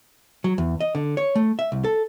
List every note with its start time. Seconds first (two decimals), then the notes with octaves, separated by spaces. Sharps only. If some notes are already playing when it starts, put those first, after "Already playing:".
0.44 F#3
0.58 E2
0.80 D#5
0.95 D3
1.17 C#5
1.35 A3
1.59 E5
1.72 C2
1.84 A4